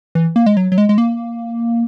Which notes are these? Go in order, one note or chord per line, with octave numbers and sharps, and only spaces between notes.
E3
A#3
G#3
F#3
F#3
G#3
G#3
A#3